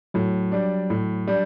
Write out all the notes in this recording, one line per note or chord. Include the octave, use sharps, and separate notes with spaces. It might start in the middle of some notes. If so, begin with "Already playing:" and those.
A2 F#3
G3 D4
A2
G3 D4